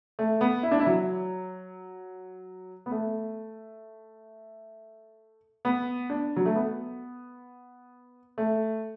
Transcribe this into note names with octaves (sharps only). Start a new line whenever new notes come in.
A3
B3
E4
D4
E4
F#3
B3
A3
B3
D4
F#3
A3
B3
A3